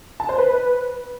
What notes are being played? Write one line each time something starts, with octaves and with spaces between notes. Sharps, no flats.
A5
C5
B4